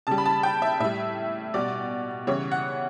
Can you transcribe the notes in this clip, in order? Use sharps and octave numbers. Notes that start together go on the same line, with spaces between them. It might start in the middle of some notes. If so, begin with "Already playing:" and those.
C#3 G3 A5
B5
A5
G5
E5
A2 G3 E5
B2 G3 D5
C#3 E3 G3 C#5
F#5